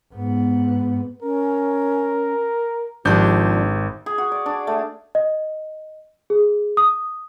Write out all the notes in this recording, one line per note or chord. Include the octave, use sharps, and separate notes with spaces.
G#2 B3
C#4 A#4
G#1 F3 D4 G4 G6
G#4
F#4
D5
D4
A3
D#5
G#4
D#6